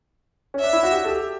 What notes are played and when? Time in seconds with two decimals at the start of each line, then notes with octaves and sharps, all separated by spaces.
0.54 C#4
0.60 D4 E5
0.73 E4
0.83 F#4
0.92 G4
1.04 A4
1.09 G4